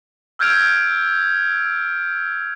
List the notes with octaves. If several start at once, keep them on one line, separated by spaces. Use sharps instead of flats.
E6 F6 G6 G#6 D7 F7